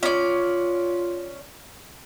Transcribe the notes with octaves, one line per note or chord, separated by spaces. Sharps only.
C#4 F4 D5